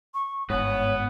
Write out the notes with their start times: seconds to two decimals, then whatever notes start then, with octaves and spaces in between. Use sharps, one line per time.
0.14 C#6
0.50 G1 G#2 B3 C#5